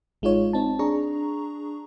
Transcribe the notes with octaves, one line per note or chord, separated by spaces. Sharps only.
A1 G#3 D#4 F4 C#5
C4 D#4 A5
D4 G#4 A#5 C#6